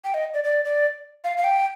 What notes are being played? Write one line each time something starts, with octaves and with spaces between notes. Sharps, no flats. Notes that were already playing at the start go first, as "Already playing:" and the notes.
G5
D#5
D5
D5
D5
F5
F5
G5